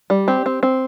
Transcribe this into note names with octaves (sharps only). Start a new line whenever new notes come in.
G3
C4 G4
C4
C4